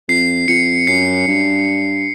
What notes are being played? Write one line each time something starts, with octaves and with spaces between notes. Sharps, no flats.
F2 C7
F2 C#7
F#2 C7
G2